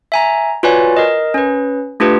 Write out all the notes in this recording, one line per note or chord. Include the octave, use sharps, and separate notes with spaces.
E5 G#5 A#5
F4 F#4 B4 C#5 D5 G#5
A#4 D#5
C#4 B4
A3 D4 F4 G4 B4